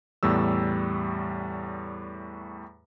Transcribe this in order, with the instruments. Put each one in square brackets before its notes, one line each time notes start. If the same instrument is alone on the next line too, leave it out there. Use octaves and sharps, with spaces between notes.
[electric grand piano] E2 A2 G3 E6